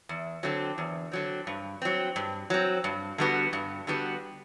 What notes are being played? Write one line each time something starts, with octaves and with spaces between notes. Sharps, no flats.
E2
D3 F#3 C4
E2
D3 F#3 C4
G2
F#3 C4
G2
F#3 C4
G2
D3 G3 B3 F#4
G2
D3 G3 B3 F#4